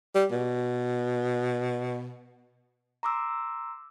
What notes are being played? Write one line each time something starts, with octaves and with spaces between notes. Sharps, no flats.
G3
B2
A#5 C6 D6 E6